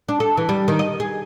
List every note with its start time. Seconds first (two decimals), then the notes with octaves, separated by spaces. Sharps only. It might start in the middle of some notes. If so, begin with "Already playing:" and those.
0.09 D4
0.20 A4
0.37 E3
0.49 G3
0.68 D#3
0.79 D#5
1.00 G#4